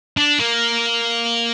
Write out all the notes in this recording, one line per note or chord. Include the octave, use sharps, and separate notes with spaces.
D4
A#3